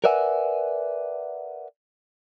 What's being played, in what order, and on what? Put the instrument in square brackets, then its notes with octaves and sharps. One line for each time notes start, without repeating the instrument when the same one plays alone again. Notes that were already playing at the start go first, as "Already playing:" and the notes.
[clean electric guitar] A#4 B4 D5 E5 F#5 G#5